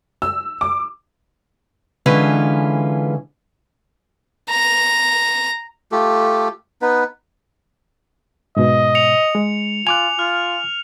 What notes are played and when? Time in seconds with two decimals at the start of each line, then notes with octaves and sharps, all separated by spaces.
0.22 E6
0.61 D6
2.06 D3 E3 G#3 C#4 F4 B4
4.50 A#5
5.92 A3 F4 G4 A4
6.82 B3 D#4 B4
8.57 G#2 B2 D#5
8.95 C#7 F7
9.35 G#3
9.87 F4 G#5 D6 F#6 F7
10.19 F4 F6